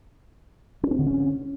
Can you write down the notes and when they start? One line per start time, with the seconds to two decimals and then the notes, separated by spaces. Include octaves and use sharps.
0.83 C#4
0.91 C4
0.99 D3
1.06 C#4